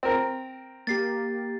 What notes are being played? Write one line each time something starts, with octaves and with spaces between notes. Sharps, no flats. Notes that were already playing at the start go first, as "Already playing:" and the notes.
C4 A#4
A#3 G4 A6 C7